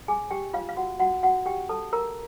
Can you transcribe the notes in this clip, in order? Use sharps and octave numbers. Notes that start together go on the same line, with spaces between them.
G#4 G#5
G4 G5
F4 F5
F5
F#4 F#5
F#4 F#5
F#4 F#5
G4 G5
A4 A5
A#4 A#5